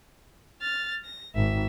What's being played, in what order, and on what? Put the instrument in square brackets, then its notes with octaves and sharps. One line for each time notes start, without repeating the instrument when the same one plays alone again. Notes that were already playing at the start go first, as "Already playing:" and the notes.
[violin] F6 A6
A#6
[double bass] G#1 [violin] E5